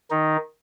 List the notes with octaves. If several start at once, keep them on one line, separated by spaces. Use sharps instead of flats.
D#3 D#4